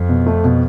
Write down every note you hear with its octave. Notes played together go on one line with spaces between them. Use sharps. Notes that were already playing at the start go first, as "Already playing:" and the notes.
Already playing: F2
B2
A3
B2